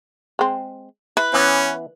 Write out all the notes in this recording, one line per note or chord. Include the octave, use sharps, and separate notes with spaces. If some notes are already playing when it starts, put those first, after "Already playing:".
G#3 C4
E4 B4
E3 B3 C#4